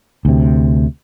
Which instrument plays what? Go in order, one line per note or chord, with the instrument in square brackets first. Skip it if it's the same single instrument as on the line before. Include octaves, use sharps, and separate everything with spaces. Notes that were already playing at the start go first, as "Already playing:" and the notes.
[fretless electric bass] D2 C3